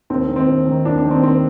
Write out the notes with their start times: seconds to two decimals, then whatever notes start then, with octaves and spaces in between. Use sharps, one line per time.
0.10 D#2 C4
0.29 D#3
0.36 C4
0.48 D#2
0.67 D#3
0.85 D#2 D4
0.98 D4
1.05 D#3
1.11 C4
1.23 D#2 C4